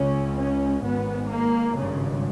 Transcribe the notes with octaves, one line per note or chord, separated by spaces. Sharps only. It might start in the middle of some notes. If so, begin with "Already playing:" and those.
Already playing: C#2 C#3 C#4
C#4
G#1 G#2 B3
A#3
G#1 G2 C#3